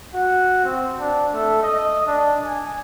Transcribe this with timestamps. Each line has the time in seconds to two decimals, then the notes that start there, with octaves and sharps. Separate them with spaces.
0.15 F#4
0.64 C4
0.99 D4
1.34 A3
1.63 D#5
2.07 D4
2.45 G#5